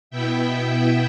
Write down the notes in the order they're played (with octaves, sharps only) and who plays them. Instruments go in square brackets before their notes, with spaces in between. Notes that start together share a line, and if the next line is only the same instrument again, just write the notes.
[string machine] B2 B3 E4 E5 G5